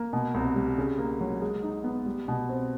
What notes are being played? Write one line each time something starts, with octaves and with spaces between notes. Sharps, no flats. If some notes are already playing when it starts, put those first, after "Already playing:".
Already playing: A#3
B2
C2
G3
C#3
A#3
F#3
G#3
D#4
B3
G3
B2
C4